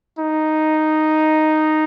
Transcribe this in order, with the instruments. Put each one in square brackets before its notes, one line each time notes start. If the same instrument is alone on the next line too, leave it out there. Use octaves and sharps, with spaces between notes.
[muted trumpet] D#4